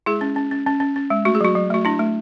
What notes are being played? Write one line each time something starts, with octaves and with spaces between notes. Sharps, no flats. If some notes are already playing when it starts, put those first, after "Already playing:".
G#3 E4 G#4
C#4
C#4
C#4
C#4
C#4
C#4
G#3
A3 F#4
G#4
F#3 F#4
F#3
A3 F#4
D4 E4
A3